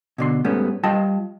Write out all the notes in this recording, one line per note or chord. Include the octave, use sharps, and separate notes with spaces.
B2 D3 C6
G#2 G3 A3 B3 C#4
G3 F4 D#5 G5 A5